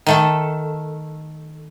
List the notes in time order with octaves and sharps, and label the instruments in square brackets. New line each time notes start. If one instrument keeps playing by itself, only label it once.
[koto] D#3 A3 A4